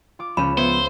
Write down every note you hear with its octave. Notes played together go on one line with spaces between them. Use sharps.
F4 D6
C#2 F3 C#4 B5 G6
F3 B3 C5 E5 E6 G#6